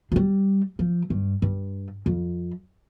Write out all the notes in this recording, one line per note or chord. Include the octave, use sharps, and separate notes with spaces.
F3
G3
F3
G2
G2
F2